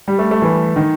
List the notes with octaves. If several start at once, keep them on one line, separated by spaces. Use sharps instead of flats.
G3
A3
A3
E3
D#3